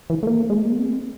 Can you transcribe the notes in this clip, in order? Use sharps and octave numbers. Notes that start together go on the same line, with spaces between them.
E3
A3
A#3
G#3
A3
A#3
B3
C4